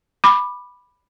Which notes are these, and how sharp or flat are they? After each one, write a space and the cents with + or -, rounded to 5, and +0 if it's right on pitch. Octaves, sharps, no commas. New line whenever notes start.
B5 +0 D6 +20